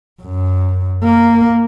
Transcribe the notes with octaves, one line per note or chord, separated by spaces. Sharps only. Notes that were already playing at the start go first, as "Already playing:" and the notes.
F#2
A#3